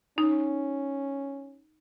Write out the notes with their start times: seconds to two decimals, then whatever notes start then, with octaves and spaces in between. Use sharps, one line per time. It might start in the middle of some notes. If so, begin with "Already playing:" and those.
0.18 C#4 D#4